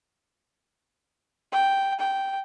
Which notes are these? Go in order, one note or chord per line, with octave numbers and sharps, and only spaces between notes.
G5
G5